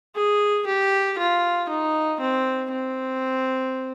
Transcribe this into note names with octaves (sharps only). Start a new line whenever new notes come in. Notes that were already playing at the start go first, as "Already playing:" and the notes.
G#4
G4
F4
D#4
C4
C4